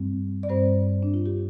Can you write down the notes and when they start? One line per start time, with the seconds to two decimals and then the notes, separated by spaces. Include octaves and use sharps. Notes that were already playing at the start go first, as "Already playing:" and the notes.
Already playing: G2 G3 C4
0.43 D5
0.49 G2 G3 C4 C5
1.03 D4
1.14 F4
1.26 G4